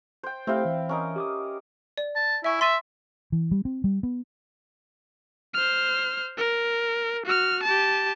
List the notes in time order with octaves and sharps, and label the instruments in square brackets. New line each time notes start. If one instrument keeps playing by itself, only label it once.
[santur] C5 G5
[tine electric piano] A3 G4 [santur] C4 E4 F5
[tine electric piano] E3
[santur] C#4 A#4 D#5
[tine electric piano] G4 D6 D#6
[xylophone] D5
[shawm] A5
[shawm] E4 [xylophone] E5 G#5 C#6
[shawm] E5 [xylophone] C6 A6 D#7
[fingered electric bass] E3
G3
C4
G3
B3
[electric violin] C5 F6
A#4
F#4 F6
G4 A5